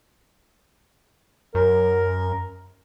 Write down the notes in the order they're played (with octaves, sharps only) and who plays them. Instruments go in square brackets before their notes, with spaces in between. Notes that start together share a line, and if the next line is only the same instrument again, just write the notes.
[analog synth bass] F#2 [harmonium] A#4